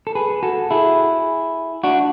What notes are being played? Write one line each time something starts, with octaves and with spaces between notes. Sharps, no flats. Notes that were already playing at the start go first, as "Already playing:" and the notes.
A4
G#4 B4
F#4 A4
E4 G#4
D4 F#4